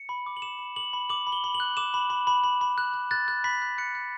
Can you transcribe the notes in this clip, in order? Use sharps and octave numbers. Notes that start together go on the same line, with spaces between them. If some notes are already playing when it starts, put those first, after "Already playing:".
Already playing: C#7
B5
D6
F#7
D6 E7
B5
D6 F#7
B5
D6 F#7
B5
G7
B5
F#7
F#6
D6 E7
B5
B5
B5
B5
B5
F#6
F#6
F#6 A6
F#6
B5 B6
F#6
F#6 C#7
F#6